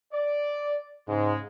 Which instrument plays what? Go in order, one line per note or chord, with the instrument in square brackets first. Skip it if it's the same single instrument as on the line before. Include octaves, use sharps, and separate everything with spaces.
[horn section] D5
[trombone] G#2 [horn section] C#3 G#3